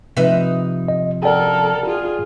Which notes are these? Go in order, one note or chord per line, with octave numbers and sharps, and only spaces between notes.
C3 F3 D#4 B4 E5
D#5
A4 A#4 D5 F#5 G5
F4 G#4